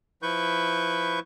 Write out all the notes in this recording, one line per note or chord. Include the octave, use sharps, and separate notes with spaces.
F3 E4 B4 C#6 G6